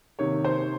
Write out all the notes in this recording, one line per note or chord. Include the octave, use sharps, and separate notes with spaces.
C3 D#3 A#3 C#5
C5